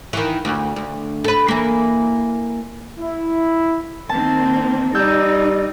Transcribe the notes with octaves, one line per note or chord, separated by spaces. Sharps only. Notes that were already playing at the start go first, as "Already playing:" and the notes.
D#3 E3
D2
D2
A4 B4
E3 A#3
E4
D#3 A#3 C4 A5
G3 D#4 D5 D#5 E6 G6